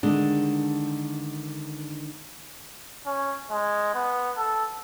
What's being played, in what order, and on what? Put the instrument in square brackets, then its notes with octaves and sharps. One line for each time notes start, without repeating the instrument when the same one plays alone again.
[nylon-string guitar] D3 D#3 G#3 D4
[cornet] C#4
G#3
B3
A4